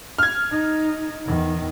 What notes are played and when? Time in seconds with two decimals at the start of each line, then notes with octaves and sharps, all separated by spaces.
0.18 F6 G#6
0.51 D#4
1.26 E2 D#3